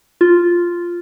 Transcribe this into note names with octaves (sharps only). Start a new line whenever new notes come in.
F4